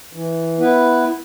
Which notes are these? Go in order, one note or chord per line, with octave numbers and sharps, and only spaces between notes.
E3
B3 E4 B4